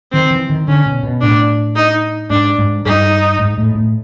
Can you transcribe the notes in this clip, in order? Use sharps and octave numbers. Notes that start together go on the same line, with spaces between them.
D#3 C4
E3
D#3
D3 C#4
B2
B2
A2 D4
D#4
G#2 D4
G#2
G2 D#4
G#2
A2
A2